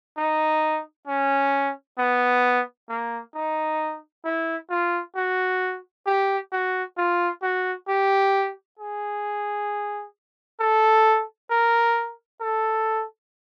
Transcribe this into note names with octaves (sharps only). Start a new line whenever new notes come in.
D#4
C#4
B3
A#3
D#4
E4
F4
F#4
G4
F#4
F4
F#4
G4
G#4
A4
A#4
A4